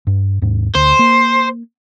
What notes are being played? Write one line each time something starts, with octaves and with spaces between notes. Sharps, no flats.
G2
D#2 G#2
D2 C5
A#3